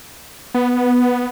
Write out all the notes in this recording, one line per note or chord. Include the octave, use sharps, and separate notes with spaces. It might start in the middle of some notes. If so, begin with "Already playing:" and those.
B3